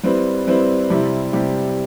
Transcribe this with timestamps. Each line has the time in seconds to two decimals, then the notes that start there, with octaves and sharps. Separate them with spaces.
0.03 G3 C4 E4 B4
0.47 G3 C4 E4 B4
0.90 C3 G3 C4 E4 G4
1.33 C3 G3 C4 E4 G4